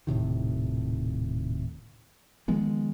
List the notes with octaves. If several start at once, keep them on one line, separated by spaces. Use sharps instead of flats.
D#1 A2 C3 D#3
D#3 F3 G#3 B3